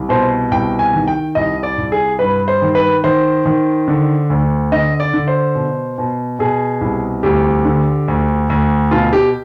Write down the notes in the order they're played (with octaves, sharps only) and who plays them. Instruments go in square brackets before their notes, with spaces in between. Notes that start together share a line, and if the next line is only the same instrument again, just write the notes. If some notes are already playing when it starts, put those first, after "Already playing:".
Already playing: [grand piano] C2
B2 C5
C2 G5
G#5
D#3
G5
C2 D#5
D5
C2
G#4
G2 B4
C5
D#3
B4
D#3 C5
D#3
D3
D2
D3 D#5
D5
D3
C5
B2
B2
B2 G#4
C2
D2 G4
D3
D2
D2
B2 F4
G4